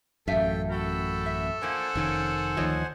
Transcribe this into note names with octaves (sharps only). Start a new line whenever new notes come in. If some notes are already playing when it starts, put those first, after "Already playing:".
A1 F#2 A3 A4 E5 F5 G5
F#4 A4 G5 B5
E5
F3 A#3 D4 C5 F#5 G#5
F1 A#2 D#3 C#4
D2 D#3 F3 D#4 C#5 D#5